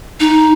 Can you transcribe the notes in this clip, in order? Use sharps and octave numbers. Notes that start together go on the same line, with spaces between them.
D#4